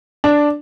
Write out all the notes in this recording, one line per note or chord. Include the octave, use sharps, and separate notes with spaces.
D4